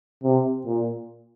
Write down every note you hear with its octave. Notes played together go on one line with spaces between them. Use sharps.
C3
A#2